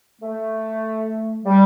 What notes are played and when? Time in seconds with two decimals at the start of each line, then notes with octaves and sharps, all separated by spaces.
0.22 A3
1.45 G3